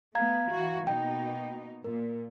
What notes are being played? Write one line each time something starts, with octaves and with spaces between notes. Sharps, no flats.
A3 B3 F5 A#5 G#6
E3 F#4
B2 A#3 D#4 G5
A#2 A#4